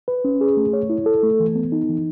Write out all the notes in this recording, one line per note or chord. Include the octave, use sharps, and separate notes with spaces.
B4
C#4
G#4
A3
C#5
E4
A4
A3
E3
B3
D#4
E3